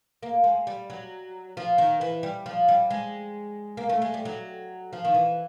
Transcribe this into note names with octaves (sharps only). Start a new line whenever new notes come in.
A#3
G#3
G3
F#3
F3
D#3
E3
G3
F3
G3
G#3
A#3
A3
G#3
G3
F#3
F3
D#3
E3